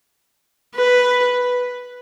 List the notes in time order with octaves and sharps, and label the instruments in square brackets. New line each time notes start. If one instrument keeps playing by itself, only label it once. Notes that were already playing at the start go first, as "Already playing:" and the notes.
[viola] B4